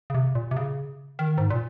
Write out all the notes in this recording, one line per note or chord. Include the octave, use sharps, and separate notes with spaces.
C#3
C3
A#2
C3
C#3
D#3
G#2
A#2